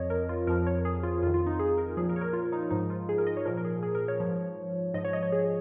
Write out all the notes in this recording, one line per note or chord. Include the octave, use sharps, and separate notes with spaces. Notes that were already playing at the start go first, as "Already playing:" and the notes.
Already playing: F2 F3 C#5 D#5
A#4
F4
F2 F3 A#4
C#5
G#4
F4
F2 D#3 F4
F4
D#4
G#4
A#4
A#2 F3 G#4
A#4
C#5
A#4
F4
D#4
G#2 F3 D#4
F4
G#4
A#4
D#5
C#5
A#2 F3 A#4
A#4
G#4
G#4
A#4
C#5
G#2 F3
G#2 F3 D#5
C#5
D#5
C#5
G#4